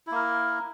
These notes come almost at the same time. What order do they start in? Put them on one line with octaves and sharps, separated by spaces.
E4 A#3 A#4